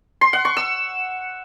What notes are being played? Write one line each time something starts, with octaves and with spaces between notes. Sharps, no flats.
C6
F#5
C#6
E6